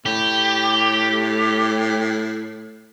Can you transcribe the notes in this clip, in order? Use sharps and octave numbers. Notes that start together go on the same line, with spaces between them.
A2 G4